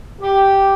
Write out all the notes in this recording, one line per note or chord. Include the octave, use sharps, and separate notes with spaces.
G4